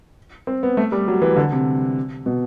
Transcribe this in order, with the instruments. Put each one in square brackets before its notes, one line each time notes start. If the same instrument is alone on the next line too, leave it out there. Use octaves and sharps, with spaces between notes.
[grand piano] C4
B3
A3
G3
F#3
E3
D3
C3
B2